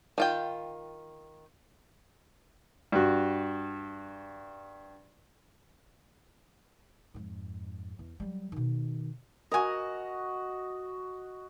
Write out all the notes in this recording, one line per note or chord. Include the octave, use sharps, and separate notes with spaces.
D#3 F4 G5
G2 F#4
F2 G#2
E2
F#3 G3
B2 D#3
F#4 A#4 D#5 G#5